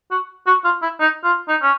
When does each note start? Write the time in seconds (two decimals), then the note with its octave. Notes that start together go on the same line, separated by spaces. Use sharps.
0.11 F#4
0.47 F#4
0.64 F4
0.82 E4
1.00 D#4
1.24 F4
1.48 D#4
1.62 C#4